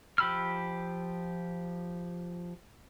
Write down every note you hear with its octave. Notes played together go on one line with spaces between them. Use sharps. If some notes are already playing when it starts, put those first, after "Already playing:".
F3 G4 B5 E6 F6